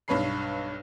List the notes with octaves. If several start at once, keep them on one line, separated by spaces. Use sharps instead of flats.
B1 G2 B4 C#5 B5 C7